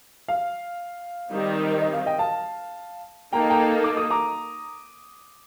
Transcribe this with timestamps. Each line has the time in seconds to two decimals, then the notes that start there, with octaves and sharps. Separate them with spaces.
0.28 F5
1.30 D#3 G3 C4 D#4 G4
1.82 D#5
1.93 F5
2.06 D#5 G5
2.19 F5 A5
3.32 A#3 D#4 A4 G5 A#5
3.50 G5 A#5
3.84 D6
3.97 D#6
4.10 A#5 D6